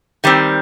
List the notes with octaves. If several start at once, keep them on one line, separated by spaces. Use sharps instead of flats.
D#3 G3 C4